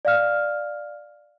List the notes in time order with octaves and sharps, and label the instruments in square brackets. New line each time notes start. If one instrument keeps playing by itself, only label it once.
[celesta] D5 F5 F6